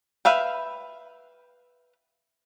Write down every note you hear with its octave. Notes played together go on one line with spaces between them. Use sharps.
B4 E5 F5 G5